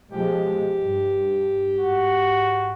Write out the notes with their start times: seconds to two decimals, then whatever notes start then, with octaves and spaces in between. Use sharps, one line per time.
0.12 B2 F3 G#3 G4
0.76 G2
1.79 G#2 F#4